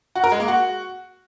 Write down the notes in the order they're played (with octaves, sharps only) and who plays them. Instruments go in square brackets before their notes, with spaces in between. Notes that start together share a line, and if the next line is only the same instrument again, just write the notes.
[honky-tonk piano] F#4
A#4
G#3
A#3
F#4